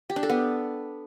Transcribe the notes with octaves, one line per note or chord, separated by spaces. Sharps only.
G4
D4
A4
B3